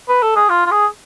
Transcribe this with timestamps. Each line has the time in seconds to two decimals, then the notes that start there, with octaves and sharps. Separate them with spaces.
0.09 B4
0.22 A4
0.36 G#4
0.49 F4
0.66 F4
0.71 G#4